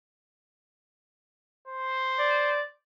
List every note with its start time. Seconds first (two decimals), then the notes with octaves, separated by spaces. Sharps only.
1.67 C5
2.19 D5